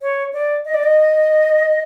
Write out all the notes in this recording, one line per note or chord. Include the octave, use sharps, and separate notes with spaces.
C#5
D5
D#5
D5
D#5